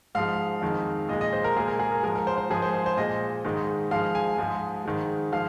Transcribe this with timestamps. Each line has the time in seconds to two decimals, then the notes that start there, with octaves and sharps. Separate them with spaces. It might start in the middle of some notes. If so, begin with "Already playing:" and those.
0.15 G#2 F3 G#3 F5
0.62 F2 D#3 G#3
1.08 A#2 D#5
1.13 G#3
1.21 D#5
1.33 C5
1.44 A#4
1.57 A#2 G#3 G#4
1.68 A#4
1.79 G#4
1.92 A#4
2.03 G#2 F3 G#3 A#4
2.15 A#4
2.27 C5
2.38 C5
2.50 G#2 F3 G#3 G#4
2.62 C5
2.74 C5
2.86 C5
2.97 A#2 G#3 D#5
3.45 G#2 D#3 G#3
3.91 G#2 F3 G#3 F5
4.15 G#5
4.38 G#2 F3 G#3
4.85 G#2 D#3 G#3
5.32 F3 G#3 F5